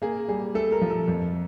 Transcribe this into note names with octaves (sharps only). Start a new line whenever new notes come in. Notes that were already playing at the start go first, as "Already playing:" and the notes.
A#3 G#4
G3 G#4
A3 A4
A#4
F3
A4
F2